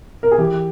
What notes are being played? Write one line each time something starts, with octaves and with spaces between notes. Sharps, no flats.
A#4
G#4
E3 G4